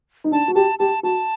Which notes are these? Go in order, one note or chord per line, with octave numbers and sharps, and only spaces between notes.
D#4
D4 A5
F#4
G4 A5
G4 A5
F#4 A5